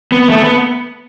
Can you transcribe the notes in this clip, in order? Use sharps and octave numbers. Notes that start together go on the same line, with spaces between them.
B3
A3
B3